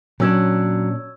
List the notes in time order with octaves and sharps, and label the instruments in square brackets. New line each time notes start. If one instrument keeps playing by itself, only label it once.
[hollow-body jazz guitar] A#2 C#4 D4 [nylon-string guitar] F#3 [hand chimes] C#5 E6 G#6